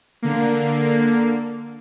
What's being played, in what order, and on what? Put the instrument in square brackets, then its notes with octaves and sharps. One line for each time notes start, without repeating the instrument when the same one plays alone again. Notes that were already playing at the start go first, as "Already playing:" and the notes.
[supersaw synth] D3 A#3